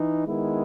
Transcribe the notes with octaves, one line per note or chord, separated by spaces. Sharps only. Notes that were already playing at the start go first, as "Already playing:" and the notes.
Already playing: E3 D#4
D#3 G#3 B3 E4